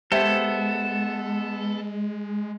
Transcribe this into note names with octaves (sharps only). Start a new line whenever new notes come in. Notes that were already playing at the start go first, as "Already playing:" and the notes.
G#3 B3 G4 A4 C5 E5